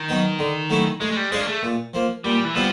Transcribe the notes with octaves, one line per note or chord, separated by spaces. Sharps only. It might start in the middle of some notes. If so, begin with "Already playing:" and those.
Already playing: D#3
F#3 B3 D#4
D3
F#3 A3 C#4 E4
G#3 A3
G#3
G3
G#3 D4 F4 G#4 C#5
A#3
A3
A#2
F3 A#3
A#2 G3
E3
F3 G3 B3 E4